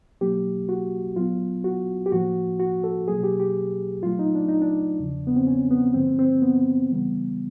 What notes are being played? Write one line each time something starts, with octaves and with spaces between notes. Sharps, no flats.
B2 F#3 A#3 G4
F#4
A#2 F#3 B3 F4
F#4
G4
A2 F3 A#3 F#4
F#4
A4
B2 F#3 A#3 G#4
G4
G4
A#2 F#3 A3 F4
D#4
D4
D#4
D4
E2 C#3 F3
B3
C4
C#4
B3
G2 D3 F3 A#3 C4
C4
B3
C#3 E3 G3 B3